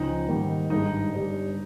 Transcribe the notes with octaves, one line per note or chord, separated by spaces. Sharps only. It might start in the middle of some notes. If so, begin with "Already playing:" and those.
Already playing: C#2 C#3 F3 D#4
G#2 D#3 G3 A#3
G#1 G2 D#3 G#3 D#4
G1 G2 G3